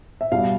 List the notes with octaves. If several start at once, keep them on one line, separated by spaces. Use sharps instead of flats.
E5
B2 G3 F5